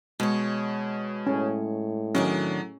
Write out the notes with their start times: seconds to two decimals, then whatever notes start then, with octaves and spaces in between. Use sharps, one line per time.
0.20 B2 G#3 C#5
1.27 A2 C#4
2.15 D#3 F#3 C#4 D4 D#5